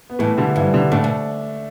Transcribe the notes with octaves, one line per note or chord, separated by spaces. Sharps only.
B3
A2 E3 A3
D3 G3
G2 E3
D3 G3
A2 A3 D4
B2